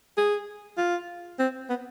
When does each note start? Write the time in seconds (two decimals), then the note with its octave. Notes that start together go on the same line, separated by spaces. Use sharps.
0.17 G#4
0.77 F4
1.39 C4
1.69 B3